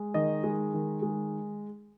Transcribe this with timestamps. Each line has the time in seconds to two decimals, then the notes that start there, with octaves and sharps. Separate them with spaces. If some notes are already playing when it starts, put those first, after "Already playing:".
Already playing: G#3
0.14 D#3 D#5
0.44 G#3
0.73 D#3
1.02 G#3